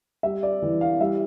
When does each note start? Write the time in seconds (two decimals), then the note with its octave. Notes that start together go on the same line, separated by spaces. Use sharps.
0.23 G3 E5
0.43 D5
0.62 E3
0.81 F5
1.00 G3 E5